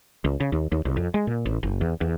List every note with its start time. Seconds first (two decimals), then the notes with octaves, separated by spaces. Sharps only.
0.24 C#2
0.40 C#3
0.52 D#2
0.72 D#2
0.85 C2
0.97 F2
1.14 G#3
1.27 A#2
1.46 A1
1.63 F#1
1.81 E2
2.01 E2